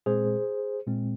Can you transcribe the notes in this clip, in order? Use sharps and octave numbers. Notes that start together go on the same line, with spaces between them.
A#2 G#3 C4 G#4 C5
A#2 G#3 C4